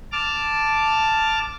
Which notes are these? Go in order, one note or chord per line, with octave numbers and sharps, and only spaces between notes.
A5 D6 F6